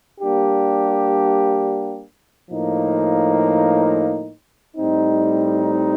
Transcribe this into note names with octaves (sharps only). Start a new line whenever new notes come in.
G3 A#3 D4 G4
A2 F3 A#3 D#4
A2 G3 C4 D#4